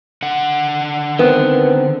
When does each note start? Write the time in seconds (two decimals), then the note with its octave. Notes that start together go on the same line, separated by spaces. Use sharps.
0.23 D3 F#5
1.19 D#3 B3 C4